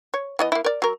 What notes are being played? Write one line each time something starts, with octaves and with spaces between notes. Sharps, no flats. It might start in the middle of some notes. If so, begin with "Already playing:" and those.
C#5
E3 B3 D#5
A#3 E4
A#4 D5
F#3 A#4